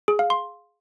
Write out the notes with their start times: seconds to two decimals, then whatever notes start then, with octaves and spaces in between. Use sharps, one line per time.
0.08 G#4
0.19 F5
0.30 C6